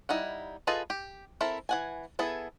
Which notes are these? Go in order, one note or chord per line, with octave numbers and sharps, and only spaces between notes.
G3 D#4 E4 F#5
F4 G#4 A4 B4 D#5
G4
C4 E4 A4 A#4 E5
E3 F#5 G#5
B3 E4 G#4 A4